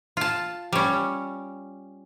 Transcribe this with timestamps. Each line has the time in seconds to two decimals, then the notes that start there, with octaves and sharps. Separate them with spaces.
0.17 F4 A5
0.73 G3 C#4